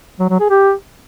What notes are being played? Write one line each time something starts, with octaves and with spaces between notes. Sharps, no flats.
F#3
F#3
G#4
G4